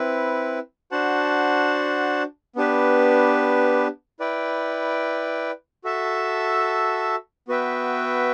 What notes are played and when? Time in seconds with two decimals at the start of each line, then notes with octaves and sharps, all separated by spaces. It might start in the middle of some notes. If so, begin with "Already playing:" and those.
Already playing: C4 E4 B4
0.91 D4 F#4 C5 F#5 A5
2.56 B3 D4 G4 B4
4.20 E4 B4 D5 G5
5.84 F#4 A4 E5 A5
7.48 B3 F#4 B4 E5 G5